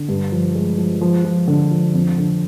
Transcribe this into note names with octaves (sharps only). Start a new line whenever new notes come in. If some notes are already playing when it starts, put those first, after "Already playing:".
Already playing: D3
G2
F3
G#3
F3
F3
F3
D3
F3
F2
D3